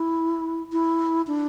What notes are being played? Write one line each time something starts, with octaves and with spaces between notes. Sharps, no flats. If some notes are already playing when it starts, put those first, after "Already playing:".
Already playing: E4
E4
D4